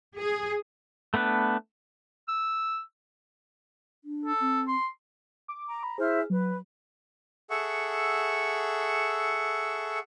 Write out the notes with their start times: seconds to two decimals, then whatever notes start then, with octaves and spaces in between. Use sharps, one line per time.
0.17 G#4
1.14 A3 B3 D4 B4
2.28 E6
4.05 D4
4.25 A4
4.40 C4
4.68 C6
5.48 D6
5.68 A#5
5.83 B5
5.98 E4 G#4 C5 F6
6.30 F#3 B4
7.50 G#4 A4 E5 F#5 C#6